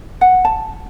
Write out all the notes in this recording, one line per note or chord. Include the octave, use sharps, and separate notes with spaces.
F#5
A5